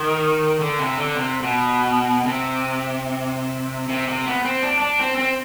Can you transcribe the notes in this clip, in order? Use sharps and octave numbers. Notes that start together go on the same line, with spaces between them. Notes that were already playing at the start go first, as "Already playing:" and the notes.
Already playing: D#3
D3
C3
D3
C3
B2
C3
C3
C3
B3
C4
D4
D4
C4
C4